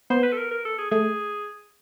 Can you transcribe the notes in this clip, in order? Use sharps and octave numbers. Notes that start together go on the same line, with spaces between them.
B3 C5
B4
A4
A#4
A#4
A4
G#4
A3 G#4